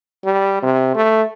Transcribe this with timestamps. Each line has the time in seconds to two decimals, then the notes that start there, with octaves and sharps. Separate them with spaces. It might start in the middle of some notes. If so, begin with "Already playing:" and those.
0.24 G3
0.63 C3
0.95 A3